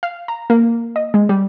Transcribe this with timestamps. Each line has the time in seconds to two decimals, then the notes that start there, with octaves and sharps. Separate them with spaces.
0.03 F5
0.28 A#5
0.50 A#3
0.96 D#5
1.14 G#3
1.29 G3